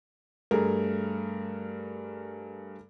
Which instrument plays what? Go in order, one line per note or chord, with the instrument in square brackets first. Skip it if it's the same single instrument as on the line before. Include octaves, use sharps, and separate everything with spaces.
[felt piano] G2 A3 G#4 A#4